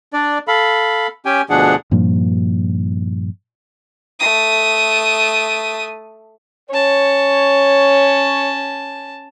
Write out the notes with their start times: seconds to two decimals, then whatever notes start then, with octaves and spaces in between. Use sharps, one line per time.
0.13 D4 D5
0.48 A4 F5 B5
1.25 C#4 G4 G5 G#5
1.50 D2 B2 F3 D4 G#4 F#5
1.91 G2 A#2 F3 A#3
4.20 A3 D#6
6.70 C#4 C#5 A5